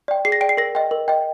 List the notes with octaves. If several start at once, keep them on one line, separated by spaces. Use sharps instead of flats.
D5 G5
G#4 C7
A#6
D5 G5 D7
C7
A#4 A#6
D#5 G5
A#4
D#5 G5